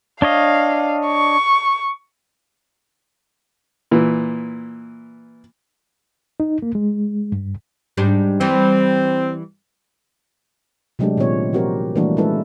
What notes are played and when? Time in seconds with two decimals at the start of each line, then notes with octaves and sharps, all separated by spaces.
0.22 D4 C#5 D#5 F5
1.07 C#6
3.91 A#2 E3
6.40 D#4
6.62 A#3
6.75 G#3
7.32 G2
7.97 G#2 G3 D4
8.41 E3 G3 C4
10.99 C3 F#3 G#3 A3 D4 G4
11.17 A#2 D#3 B3 C4 F4 C#5
11.53 F3 C4 F#4 G4 A#4 C5
11.96 E3 G3 A3 A#3 D4 F#4
12.17 G#3 C#4 E4 A4 B4